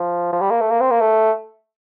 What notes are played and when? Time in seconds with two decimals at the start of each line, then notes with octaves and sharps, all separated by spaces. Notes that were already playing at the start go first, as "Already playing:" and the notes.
Already playing: F3
0.32 F3
0.41 G3
0.51 A#3
0.61 A3
0.70 A#3
0.80 C4
0.91 A#3
1.01 A3